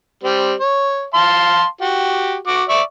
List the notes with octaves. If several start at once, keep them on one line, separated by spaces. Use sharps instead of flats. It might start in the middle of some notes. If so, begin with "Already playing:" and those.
G3 C4
C#5
F5 A5 C6
F#4 G4
F#4 D6
D5 E5 C#6